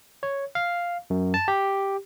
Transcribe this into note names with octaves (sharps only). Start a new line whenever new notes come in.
C#5
F5
F#2
A5
G4